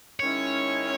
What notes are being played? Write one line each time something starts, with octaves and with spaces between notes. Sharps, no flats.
D#3 G#3 C#4 E4 C#5